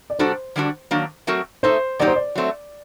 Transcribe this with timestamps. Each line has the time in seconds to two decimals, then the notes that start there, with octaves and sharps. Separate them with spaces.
0.10 D5
0.19 C3 G3 D4 F#4 A4 C5
0.56 D3 G3 D4 F#4
0.91 D#3 F#3 A#3 D4
1.27 F#3 A3 C4 F#4 A#4
1.63 A3 D#4 A4 C5
1.99 A#2 F#3 A#3 D#4 G4 D5
2.07 C5
2.16 D5
2.35 F#3 A3 C4